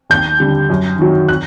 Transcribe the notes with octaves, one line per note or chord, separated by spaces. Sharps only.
D#2 G6
D3 G3
F#2
D#3 F#3
F#6